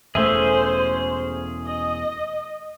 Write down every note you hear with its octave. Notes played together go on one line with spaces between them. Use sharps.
E1 A3 C#4 G#4 C5 E5
D#5